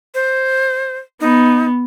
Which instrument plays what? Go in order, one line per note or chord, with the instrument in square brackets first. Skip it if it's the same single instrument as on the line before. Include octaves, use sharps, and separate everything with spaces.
[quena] C5
[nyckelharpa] B3 [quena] D#4